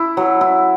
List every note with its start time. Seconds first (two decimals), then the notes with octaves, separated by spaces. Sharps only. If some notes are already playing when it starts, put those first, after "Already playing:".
Already playing: E4
0.17 F#3
0.41 E4